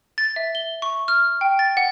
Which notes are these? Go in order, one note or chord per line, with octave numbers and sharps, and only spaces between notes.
A6
E5
G7
C#6
F6
G5
A6
F#5